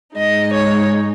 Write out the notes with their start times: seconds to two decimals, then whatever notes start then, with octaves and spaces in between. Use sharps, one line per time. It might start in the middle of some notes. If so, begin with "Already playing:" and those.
0.16 G#2 G#3 D#4 D#5
0.52 C#5